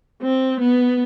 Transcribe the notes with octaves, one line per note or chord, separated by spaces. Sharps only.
C4
B3